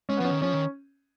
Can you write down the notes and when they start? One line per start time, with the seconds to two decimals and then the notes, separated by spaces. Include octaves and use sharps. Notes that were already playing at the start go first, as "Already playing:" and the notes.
0.09 G#3 C#4
0.17 B3
0.20 F3 C#4
0.30 D#3
0.41 F3 C#4
0.52 D#3